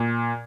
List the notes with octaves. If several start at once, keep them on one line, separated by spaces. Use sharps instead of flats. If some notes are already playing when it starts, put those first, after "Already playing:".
Already playing: A#2